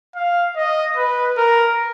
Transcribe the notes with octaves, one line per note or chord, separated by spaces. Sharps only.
F5
D#5
B4
A#4